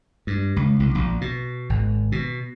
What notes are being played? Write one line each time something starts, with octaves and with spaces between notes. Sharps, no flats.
G2
C#2
C2
A#1
B2
G#1
B2